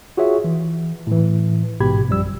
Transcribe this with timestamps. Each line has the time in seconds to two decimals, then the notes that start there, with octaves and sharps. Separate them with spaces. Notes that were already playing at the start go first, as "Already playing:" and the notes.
0.17 F4 F#4 G#4 C#5 E5
0.44 E3
1.07 A2 E3
1.80 A1 G#2 B2 G4 B5 G#6
2.08 A#1 F#2 F3 G3 E6
2.25 G1